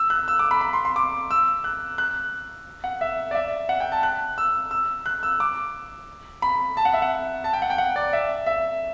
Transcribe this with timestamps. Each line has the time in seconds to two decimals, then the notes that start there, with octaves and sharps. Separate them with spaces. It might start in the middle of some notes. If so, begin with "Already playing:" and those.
Already playing: E6
0.10 F#6
0.28 E6
0.39 D6
0.51 B5
0.61 B5
0.73 C6
0.85 C6
0.96 D6
1.31 E6
1.64 F#6
1.98 F#6
2.84 F#5
3.01 E5
3.31 D5
3.35 E5
3.69 F#5
3.80 G5
3.92 A5
4.03 F#6
4.38 E6
4.71 E6
5.06 F#6
5.23 E6
5.40 D6
6.42 B5
6.77 A5
6.85 F#5
6.93 E5
7.02 F#5
7.44 A5
7.53 G5
7.62 F#5
7.70 G5
7.78 F#5
7.96 D5
8.13 E5
8.46 E5